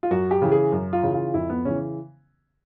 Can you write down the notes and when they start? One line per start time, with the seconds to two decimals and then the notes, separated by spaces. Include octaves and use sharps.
0.03 F4
0.11 F#2 F#4
0.31 G4
0.42 C#3 E3
0.52 G#4
0.72 F#2
0.93 F4
1.03 C#3 E3
1.14 F4
1.34 F2 E4
1.50 B3
1.65 C#3 E3 C#4